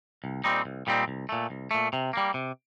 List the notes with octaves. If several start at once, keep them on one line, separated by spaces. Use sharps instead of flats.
C2
A#2 G3 C4 D#4
C2
A#2 G3 C4 D#4
C2
A#2 A3
C2
A#2 A3
C3
G3 A#3
C3